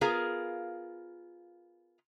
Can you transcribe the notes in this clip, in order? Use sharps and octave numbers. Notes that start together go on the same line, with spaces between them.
B3 F4 G#4 A#4 F5